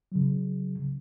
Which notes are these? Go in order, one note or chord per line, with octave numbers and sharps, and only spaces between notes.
C#3 F#3